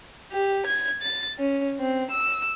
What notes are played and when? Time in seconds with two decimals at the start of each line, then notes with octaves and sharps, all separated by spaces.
0.32 G4
0.66 G#6
1.01 A6
1.38 C#4
1.79 C4
2.10 E6